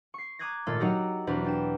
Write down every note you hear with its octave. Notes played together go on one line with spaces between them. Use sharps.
C#6 C7
A#5 D6 D#6 F#6 G#6 A#6
G#1 A#2 A3 F4 A4 A6
F#3 D#4 F#4 G4 A#5 E6
E2 B2 C4 D4 B4 A#5
D4 G5 E7